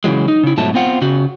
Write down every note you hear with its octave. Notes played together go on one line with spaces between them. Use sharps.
C#3 E3 F#3 G#3
D#4
C#3 E4
G#2 B2 F3 F#3 A3 A5
B3 C4 F4 F#5
C#3 F#4